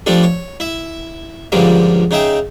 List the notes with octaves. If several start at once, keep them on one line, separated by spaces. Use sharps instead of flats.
F3 G3 A3 D4 A4
C#5
E4 E5
C#2 G2 D3 F3 G3 A#3
C#3 D#4 G#4 E5 G5